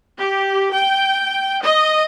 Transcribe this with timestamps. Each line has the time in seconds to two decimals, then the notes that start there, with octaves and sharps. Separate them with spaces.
0.19 G4
0.74 G5
1.63 D#5